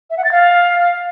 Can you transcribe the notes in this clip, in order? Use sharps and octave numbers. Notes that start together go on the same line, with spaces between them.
E5
F#5
A6
F5